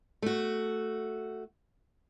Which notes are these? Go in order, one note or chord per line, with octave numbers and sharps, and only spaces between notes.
A3 F#4